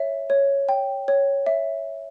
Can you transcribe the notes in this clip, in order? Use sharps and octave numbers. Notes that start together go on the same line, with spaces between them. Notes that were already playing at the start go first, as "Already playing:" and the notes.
Already playing: C#5 E5
C#5
G5
C#5
E5